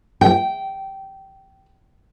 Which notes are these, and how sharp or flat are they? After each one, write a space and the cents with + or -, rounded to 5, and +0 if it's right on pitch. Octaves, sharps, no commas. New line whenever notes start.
G5 -15